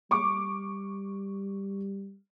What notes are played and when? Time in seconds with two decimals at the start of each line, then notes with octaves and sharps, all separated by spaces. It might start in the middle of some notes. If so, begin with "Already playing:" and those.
0.11 G3 C#6 D6